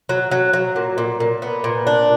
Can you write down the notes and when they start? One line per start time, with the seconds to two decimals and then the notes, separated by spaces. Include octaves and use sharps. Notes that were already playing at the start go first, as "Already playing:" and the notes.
0.09 F#3
0.31 F#3
0.53 F#3
0.76 A#2
0.98 A#2
1.20 A#2
1.42 B3
1.64 A#2
1.87 D4